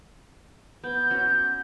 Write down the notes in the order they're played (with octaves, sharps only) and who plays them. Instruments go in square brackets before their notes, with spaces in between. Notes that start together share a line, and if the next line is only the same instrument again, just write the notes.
[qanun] B3 [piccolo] G6
[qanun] C#4 F#4